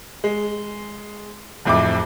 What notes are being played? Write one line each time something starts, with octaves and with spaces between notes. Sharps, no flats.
G#3
D1 F2 E4 D6